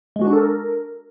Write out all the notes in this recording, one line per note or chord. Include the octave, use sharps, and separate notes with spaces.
G#3
F#4
D4
A4
A#4